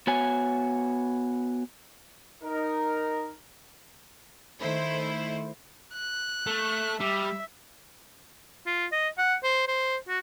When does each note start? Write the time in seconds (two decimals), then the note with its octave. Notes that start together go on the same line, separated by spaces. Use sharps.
0.07 B3 F#4 C#5 G#5
2.43 D#4 A#4
4.59 D#3 A3 E4 C5
5.93 F#6
6.46 A3
7.00 G3 E5
8.66 F4
8.92 D#5
9.18 F#5
9.43 C5
9.67 C5
10.08 F#4